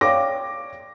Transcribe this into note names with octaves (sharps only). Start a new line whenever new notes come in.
C#5 D5 F5 G5 D6 A#6